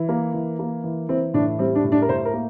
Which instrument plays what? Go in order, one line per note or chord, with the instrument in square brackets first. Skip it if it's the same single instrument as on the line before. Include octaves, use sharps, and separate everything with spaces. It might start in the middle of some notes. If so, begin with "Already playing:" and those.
Already playing: [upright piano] E3
A#3
E3
A#3
E3
E3 C4
A2 D4
G3 C4
D4
A2
D4
A#4
A2 C5
A#4
A#3